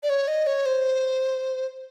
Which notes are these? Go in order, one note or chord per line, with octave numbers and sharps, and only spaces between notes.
D5
C#5
D#5
C#5
C5